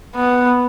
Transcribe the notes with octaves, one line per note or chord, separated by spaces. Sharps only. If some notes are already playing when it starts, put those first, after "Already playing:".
B3